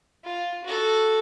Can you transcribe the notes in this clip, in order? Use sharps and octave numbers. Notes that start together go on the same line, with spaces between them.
F4
F#4 A4